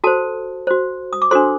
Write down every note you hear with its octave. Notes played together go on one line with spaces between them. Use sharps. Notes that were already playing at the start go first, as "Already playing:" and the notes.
F#4 A4 C5 A5
F#4 C5
D#6
D6
D4 F#4 A4 C5 C6